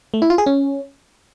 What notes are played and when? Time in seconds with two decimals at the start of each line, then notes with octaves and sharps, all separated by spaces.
0.14 A3
0.22 E4
0.30 F4
0.38 G#4
0.46 C#4